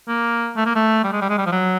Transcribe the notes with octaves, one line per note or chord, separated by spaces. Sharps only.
A#3
A3
A#3
A3
G3
G#3
G3
G#3
G3
F3
F#3